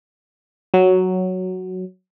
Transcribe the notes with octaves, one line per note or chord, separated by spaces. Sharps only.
F#3